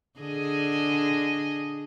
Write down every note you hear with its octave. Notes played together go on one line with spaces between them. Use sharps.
D3 G#4 D#5